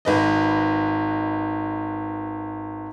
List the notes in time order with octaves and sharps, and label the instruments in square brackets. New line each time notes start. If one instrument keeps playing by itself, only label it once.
[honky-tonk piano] G#1 B4 D#5